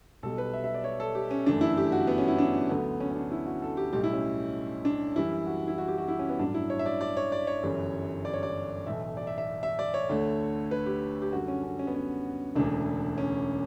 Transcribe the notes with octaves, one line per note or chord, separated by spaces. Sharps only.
B1 B2 G3 A4
B4
E5
E5
D5
C#5
A4
G4
C#4
G1 F#2 E3 A3 D4
E4
G4
F#4
B3
C#4
E4
D4
D2 D3 F#3 A3 B3
C#4
C#4
D4
E4
F#4
A4
G4
B1 A2 G3 G4
E4
C#4
D4
F#2 E3 G3 E4
F#4
E4
F#4
G4
F#4
E4
C#4
B3
A1 G2 F#3 D4
E4
C#5
E5
D5
D5
C#5
D5
C#5
G1 F#2 E3 G3
D5
C#5
D5
B1 A2 E3 A3 E5
D5
E5
E5
E5
D5
C#5
D2 D3 A3
B4
G4
G4
F#2 D3 G3 F#4
C#4
C#4
C#4
B3
C#4
E1 D2 C#3 E3 D4
C#4